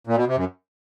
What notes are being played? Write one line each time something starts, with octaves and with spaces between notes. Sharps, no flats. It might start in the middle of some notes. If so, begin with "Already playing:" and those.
A#2
B2
C3
F#2